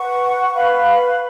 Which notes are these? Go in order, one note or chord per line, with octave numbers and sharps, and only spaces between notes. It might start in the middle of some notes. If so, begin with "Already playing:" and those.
Already playing: B4 F#5 C#6
B4 F5 B5